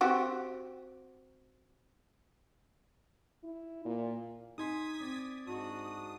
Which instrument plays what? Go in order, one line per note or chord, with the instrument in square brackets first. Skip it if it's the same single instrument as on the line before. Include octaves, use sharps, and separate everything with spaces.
[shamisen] C4 F#4 G4
[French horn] E4
A#2
[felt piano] D#4 G#5 C6 [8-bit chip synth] D#6 G#6 B6
[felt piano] C4 [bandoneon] D5
[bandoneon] G#2 D4 [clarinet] F#4 [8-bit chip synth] D#6